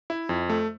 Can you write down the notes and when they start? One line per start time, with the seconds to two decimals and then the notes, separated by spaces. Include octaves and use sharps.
0.10 E4
0.29 F2
0.50 A3